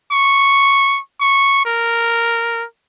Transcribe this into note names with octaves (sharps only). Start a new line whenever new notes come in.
C#6
C#6
A#4